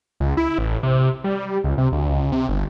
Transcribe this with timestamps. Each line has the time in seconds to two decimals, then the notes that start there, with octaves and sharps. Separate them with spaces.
0.20 C#2
0.37 E4
0.58 A1
0.83 C3
1.24 G3
1.46 G3
1.64 C#2
1.78 C3
1.92 D2
2.09 C#2
2.32 C3
2.49 G1